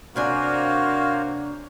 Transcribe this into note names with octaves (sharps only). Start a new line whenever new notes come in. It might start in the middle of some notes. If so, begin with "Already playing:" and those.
C3 A#3 D4 F#4 C5 C#5 F5 G#5